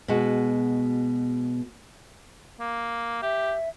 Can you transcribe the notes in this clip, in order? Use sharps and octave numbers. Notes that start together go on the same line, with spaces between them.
B2 G#3 F#4
A#3
G4 E5